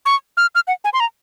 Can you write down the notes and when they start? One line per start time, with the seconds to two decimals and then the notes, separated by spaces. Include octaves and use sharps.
0.06 C#6
0.37 F6
0.55 F6
0.67 F#5
0.84 G#5
0.93 C6
1.00 A#5